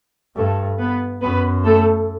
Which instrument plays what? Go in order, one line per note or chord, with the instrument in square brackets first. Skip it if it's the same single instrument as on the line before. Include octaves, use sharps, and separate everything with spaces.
[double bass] G2 [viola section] A3 A4
[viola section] B3 B4
[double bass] F#2 [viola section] B3 B4
[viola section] A3 A4